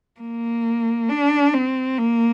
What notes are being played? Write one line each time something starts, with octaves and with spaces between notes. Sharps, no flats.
A#3
D4
C4
A#3